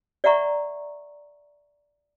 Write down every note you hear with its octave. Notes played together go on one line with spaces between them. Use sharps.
D5 E5 F#5 A#5 C#6